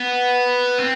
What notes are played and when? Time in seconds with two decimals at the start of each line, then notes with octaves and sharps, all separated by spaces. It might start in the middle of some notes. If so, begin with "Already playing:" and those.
Already playing: B3
0.79 C4